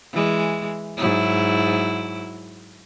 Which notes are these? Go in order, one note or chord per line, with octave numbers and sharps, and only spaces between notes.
E3 G#3
G#2 F#3 E4